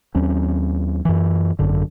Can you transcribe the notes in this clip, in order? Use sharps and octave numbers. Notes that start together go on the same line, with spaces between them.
D#2 F#3 C4 C#4
F#2 E3
G#1 F#2 D3